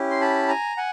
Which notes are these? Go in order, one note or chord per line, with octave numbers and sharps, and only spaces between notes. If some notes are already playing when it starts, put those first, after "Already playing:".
Already playing: C#4 E4 G4
C6
A5 B5
G#5 A#5
F#5 G#5